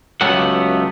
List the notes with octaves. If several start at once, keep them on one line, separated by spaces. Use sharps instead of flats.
C#2 F#3 A3 B3 G4 F#5